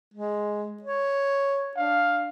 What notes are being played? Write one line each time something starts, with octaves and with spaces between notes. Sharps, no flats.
G#3
C#5
D4 F5